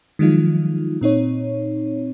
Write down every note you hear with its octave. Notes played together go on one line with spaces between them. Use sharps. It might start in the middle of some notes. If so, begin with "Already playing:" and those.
D#3 F3 F#3 G#3 D#4 F4
A#2 C4 D#4 C#5